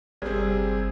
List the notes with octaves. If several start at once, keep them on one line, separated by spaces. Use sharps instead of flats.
G1 C3 G3 C4 G#4